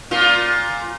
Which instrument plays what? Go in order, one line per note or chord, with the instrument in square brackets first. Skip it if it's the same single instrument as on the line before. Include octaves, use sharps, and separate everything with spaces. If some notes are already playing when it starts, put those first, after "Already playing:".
[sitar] A#2 F4